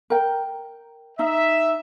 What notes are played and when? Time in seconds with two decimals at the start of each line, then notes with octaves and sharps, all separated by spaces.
0.10 A#4 G5
1.19 D#4 E5